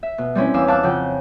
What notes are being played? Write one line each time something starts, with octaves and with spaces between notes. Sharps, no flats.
E5
B2
G3 C4 C#4 E4
E2 F5 G#5 D6 E6
F5 A5 C#6 D6 E6 F#6
F2 C#3 F#5 G5